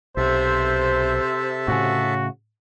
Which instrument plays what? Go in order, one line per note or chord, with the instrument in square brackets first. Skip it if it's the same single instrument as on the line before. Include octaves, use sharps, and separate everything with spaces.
[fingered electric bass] B1 [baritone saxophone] C3 [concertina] A4 E5 [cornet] C5
[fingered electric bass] A2 C#3 [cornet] F#4